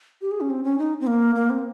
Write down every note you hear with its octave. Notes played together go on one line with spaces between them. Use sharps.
G4
G#4
C#4
C4
C#4
D#4
C4
A#3
A#3
C4